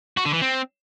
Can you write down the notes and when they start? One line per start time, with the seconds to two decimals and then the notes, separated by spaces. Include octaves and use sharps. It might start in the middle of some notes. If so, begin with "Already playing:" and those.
0.17 F#4
0.25 D3
0.33 E3
0.41 C4